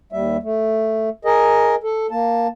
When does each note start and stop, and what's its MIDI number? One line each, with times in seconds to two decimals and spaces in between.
0.12 0.37 39
0.12 0.37 55
0.12 0.37 76
0.43 1.09 57
1.25 1.75 68
1.25 1.75 70
1.25 1.75 75
1.84 2.07 69
2.11 2.48 58
2.11 2.48 81